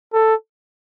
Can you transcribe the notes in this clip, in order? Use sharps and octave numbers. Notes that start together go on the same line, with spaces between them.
A4